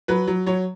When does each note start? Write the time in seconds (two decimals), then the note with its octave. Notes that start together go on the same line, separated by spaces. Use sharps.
0.08 F#3 B4
0.27 F#3
0.46 F#3 C#5